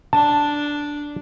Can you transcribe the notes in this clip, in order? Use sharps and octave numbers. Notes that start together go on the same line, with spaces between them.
D4 A5